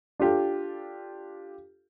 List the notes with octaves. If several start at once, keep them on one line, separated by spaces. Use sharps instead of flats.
D4 F4 G4 A4